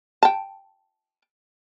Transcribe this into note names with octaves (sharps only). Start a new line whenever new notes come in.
G5 A5